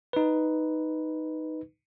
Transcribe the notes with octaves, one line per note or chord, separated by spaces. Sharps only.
D#4 B4